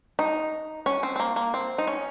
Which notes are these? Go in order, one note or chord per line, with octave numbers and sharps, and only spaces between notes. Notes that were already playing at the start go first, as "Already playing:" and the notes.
D#4
C#4
C4
C4
A#3
A#3
C4
D#4
C#4